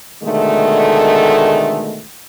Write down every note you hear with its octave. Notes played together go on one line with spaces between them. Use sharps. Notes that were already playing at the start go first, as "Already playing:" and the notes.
B2 D3 D#3 G#3 A3